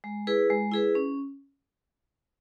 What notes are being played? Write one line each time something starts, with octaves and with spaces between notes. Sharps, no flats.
G#3
E4 G#4 B4
G#3
E4 G#4 B4
C#4